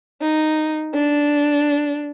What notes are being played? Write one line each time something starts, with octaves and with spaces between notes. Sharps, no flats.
D#4
D4